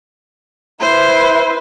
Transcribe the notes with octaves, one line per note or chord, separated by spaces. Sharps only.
E4 B4 C5